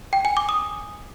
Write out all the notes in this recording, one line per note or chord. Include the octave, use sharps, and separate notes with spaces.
G5
G#5
D6
D#6